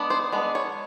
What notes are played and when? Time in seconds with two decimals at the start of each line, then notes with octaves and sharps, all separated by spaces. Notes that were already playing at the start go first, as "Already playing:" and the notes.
Already playing: G#3 B3 D4
0.10 C5
0.32 G#3 B3 D4
0.55 C#5